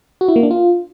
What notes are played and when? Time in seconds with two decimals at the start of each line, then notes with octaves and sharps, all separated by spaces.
0.21 F#4
0.28 E4
0.36 A#3
0.43 D4
0.51 F4